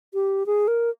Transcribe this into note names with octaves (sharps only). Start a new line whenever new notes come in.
G4
G#4
A#4